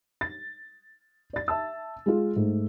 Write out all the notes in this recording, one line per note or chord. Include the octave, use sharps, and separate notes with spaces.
A6
D5 A6
E5 A5 E6
G#3 F4
G#2 A3